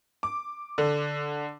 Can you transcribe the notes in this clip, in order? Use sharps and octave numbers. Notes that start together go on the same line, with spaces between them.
D6
D3